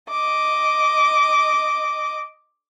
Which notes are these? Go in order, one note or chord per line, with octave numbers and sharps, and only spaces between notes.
D#5 D6